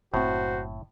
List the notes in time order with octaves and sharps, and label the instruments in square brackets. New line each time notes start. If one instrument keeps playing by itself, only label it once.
[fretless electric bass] F#1 C4 [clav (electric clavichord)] A2 [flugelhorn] F#4 [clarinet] C5